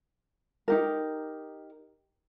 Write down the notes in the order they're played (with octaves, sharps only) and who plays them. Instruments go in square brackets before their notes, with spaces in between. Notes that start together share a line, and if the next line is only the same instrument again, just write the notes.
[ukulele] D#4 G4 A#4